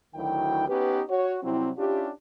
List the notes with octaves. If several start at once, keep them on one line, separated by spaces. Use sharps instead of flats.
D2 D#3 F#3 E4 G5
B3 C#4 D#4 G4 B4
F#4 C#5
C3 F#3 G3 C4 E4
C#4 D4 E4 F4 G4